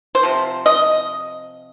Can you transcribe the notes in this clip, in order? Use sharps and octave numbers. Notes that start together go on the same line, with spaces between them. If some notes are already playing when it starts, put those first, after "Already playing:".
C5
C3 F3
D#5